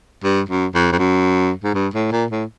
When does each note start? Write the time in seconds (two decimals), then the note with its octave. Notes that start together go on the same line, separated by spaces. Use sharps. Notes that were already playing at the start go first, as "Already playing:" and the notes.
0.24 G2
0.49 F#2
0.75 F2
0.92 F2
0.99 F#2
1.64 G#2
1.75 G2
1.94 A2
2.12 A#2
2.31 A2